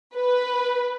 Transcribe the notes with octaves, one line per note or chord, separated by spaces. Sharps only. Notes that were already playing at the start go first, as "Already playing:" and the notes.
B4